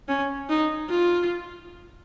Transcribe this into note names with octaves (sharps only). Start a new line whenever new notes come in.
C#4
D#4
F4